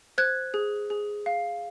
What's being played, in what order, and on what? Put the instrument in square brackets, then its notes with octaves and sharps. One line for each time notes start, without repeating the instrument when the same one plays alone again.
[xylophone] C5 F#6 G#6
G#4
G#4
F5